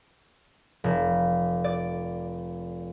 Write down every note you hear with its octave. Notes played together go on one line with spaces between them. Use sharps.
F1
D5